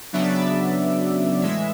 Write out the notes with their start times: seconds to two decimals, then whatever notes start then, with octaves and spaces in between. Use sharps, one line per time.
0.13 C#3 F#3 B3 D4 E5
0.22 D5
0.32 E5
1.42 A2 E3 G#3 E5